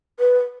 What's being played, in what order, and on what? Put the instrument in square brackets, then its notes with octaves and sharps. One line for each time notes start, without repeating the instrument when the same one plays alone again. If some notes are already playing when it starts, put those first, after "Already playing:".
[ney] B4